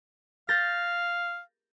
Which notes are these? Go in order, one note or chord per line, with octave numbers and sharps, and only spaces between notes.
F5 G6 A6 A#6